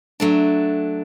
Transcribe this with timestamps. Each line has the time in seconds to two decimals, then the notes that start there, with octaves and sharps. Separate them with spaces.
0.20 F#3 A3 D4